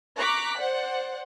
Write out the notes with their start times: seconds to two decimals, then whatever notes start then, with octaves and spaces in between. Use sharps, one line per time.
0.16 A#5 C#6 D6 F#6 B6
0.58 C5 D5 F#5